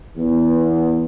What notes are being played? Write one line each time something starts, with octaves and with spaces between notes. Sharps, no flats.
E2 B3